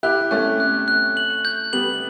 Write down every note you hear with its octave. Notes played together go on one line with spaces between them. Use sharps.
E4 G4 F#6
A3 C#4 F#6
F#6
F#6
F#7
G6
G3 B3 F#7